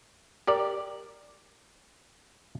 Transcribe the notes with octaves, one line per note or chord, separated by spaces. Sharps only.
G4 A#4 D5